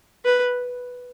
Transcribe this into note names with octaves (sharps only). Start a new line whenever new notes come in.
B4